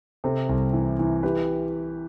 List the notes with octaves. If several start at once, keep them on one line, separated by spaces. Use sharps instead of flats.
C3 A4 C5
C2
E3
E3
E3 G4 B4